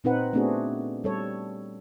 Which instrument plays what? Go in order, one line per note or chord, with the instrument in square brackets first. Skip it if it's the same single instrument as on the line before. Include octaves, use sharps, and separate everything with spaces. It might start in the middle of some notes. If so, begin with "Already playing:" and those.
[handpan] A#2 C4 D#4 B4 F#5
A3 B3 C4 D4 F#4 G#4
G3 A4 C#5